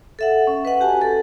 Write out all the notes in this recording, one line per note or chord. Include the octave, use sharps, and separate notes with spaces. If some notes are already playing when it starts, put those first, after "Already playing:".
A4 E5 F#5
C#4
B4 D#5 F#5
F#4 G4 G#5 A5
A4